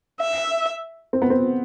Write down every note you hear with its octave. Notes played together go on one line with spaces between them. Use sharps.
E5
C4
B3
C4